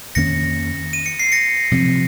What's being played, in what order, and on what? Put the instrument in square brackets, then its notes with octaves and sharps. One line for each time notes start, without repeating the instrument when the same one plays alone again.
[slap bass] F2 D#3 A#3 C#4 [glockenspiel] A#6 C#7
[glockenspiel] D#7
C#7
C7
A#6 C#7
[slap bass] C3 F3 C4